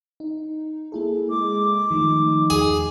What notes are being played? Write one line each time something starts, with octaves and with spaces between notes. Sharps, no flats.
D#4
A#3 E4 G#4 A4
G#3 D6
D#3 F3 A3 D#4
E2 G#4